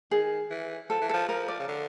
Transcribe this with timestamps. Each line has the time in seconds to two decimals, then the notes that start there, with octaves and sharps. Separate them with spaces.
0.11 D#3 G#4
0.51 E3
0.90 F3 A4
1.01 E3
1.09 F3 A4
1.29 F3 A#4
1.48 D5
1.59 C#3
1.68 D3